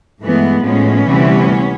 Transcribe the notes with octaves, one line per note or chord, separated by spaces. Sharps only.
G2 E3 G#3 A3 B3
A2 F3 G#3 B3 C#4
D2 C3 E3 G3